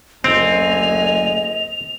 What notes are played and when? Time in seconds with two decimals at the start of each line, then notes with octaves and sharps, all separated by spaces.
0.24 F#1 D2 C4 D#5 G#5 F7